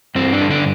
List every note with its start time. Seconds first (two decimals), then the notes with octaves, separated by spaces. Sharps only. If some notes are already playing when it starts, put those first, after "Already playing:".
0.15 G2 C4
0.33 D4
0.42 D3
0.51 D4